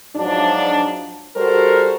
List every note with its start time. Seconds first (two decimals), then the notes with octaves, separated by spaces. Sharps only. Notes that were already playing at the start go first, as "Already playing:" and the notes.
0.16 G#2 F3 F#3 D4
1.36 G3 F#4 G4 A4 A#4 C5